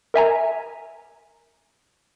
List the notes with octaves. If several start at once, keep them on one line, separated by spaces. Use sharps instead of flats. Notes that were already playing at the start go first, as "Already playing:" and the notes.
A#4 E5 G#5 A#5